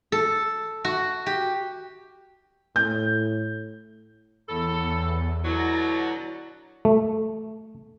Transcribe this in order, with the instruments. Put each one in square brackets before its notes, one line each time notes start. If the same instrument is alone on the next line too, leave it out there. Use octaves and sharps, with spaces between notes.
[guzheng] A4
F#4
G4
[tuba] A2 [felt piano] G6
[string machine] E2 [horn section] A2 A4 [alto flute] B5
[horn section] B2 D3 F#3 [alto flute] E4 [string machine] A#5 A6 A#6
[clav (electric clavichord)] A3